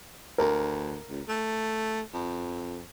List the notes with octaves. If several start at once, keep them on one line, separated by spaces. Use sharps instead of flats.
D2 A#4
C#2
A3
F2